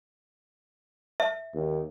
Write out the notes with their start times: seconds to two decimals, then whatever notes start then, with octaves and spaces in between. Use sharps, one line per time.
1.20 E5
1.54 D#2